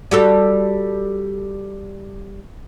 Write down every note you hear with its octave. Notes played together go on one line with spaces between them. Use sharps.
G3 F#4 A4